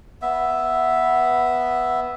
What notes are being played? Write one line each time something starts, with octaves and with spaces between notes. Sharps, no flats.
B3 E5